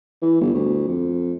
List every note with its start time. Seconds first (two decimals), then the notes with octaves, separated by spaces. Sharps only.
0.22 E3
0.41 G1
0.54 D2
0.87 F2